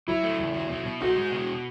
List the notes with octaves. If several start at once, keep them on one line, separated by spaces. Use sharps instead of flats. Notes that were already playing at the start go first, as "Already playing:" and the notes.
F#3 E4
A3
E2
F#3
B2
B2
D#4 F#4
G#3
B2